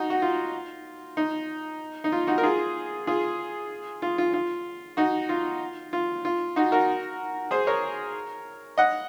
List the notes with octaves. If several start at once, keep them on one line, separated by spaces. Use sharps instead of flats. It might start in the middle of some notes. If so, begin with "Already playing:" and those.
Already playing: D#4 F#4
F#4
F4
D#4
D#4
F4
D#4 F#4
A#4
F4 G#4
F4 G#4
F4
F4
F4
D#4 F#4
F4
F4
F4
D#4 F#4
F#4 A#4
G#4 C5
A#4 C#5
D#5 F#5